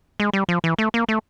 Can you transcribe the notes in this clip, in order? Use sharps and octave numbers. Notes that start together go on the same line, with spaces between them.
G#3
G3
F3
E3
A3
A#3
A3